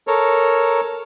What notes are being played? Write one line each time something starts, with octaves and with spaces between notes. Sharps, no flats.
A4 A#4 C#5